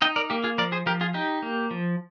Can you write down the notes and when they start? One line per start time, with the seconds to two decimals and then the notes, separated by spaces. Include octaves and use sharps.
0.02 D#4 D#5 G5
0.16 A#4 D5
0.30 A#3 G4
0.44 F4 G#4
0.58 F3 A#4 D5
0.72 G#4 C5
0.86 F3 G4 A#4
1.01 F4 G#4
1.14 D#4 G4
1.42 A#3
1.71 F3